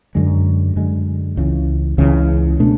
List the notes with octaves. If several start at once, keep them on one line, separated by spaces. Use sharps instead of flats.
F#2 D3 G#3
F#2 D3 G#3
C#2 C#3 E3
C#2 C#3 E3
B2 A3 D4